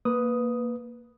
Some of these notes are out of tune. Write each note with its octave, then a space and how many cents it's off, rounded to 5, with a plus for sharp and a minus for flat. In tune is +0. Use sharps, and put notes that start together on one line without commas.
A#3 +0 B4 +0 D#6 +0